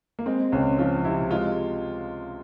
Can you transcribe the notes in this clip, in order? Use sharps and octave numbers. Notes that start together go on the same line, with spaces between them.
A#3
G#3 C4
C#2 C#4
F3 F4
C3 E4
G#3 F4